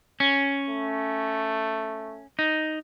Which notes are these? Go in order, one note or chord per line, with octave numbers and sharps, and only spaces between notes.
C#4
A3
D#4